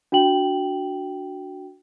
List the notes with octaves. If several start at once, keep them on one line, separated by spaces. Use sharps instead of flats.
D4 F#4 G5 F#7